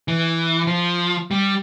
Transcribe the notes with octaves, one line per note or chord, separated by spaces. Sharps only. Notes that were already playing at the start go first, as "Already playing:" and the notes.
E3
F3
G3